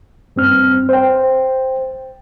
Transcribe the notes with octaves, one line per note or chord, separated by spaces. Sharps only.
G2 C4 F6
C5 G5